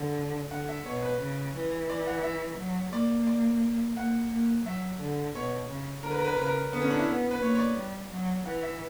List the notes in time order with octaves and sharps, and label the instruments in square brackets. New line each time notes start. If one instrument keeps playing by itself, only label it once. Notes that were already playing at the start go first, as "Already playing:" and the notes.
Already playing: [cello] D3
[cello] D3 [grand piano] F#5
[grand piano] E5
[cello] B2 [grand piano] C#5
[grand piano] B4
[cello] C#3
E3
[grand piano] D5
F#5
E5
[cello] F#3
[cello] A#3 [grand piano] D5
[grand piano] D5
[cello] A#3 [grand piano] F#5
[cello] A#3
[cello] F#3 [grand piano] E5
[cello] D3
[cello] B2 [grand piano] C#5
[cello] C#3
[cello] D3 [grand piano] A#4
[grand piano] B4
A#4
B4
A#4
[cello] C#3 [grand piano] B4
[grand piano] A#4
[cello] D3 [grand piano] B3
[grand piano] C#4
D4
E4
[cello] B3
[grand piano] B4
[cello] A#3 [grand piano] C#5
[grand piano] C#5
D5
[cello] G3
F#3
[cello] E3 [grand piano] F#5
[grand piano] E5